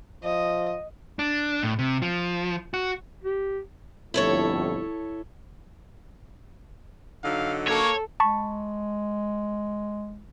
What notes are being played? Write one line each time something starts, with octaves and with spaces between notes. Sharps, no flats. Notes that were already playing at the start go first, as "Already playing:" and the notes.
F3 D#5
D4
A2
C3
F3
F#4
G4
G1 F2 A2 E4 A4 C#5
D3 F#3 D#4 F5
A#3 A4 C#5
G#3 A5 B5 C#6